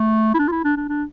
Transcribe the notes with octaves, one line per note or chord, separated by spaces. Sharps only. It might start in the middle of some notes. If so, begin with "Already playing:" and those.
Already playing: A3
E4
D4
F4
E4
D4
D4
D4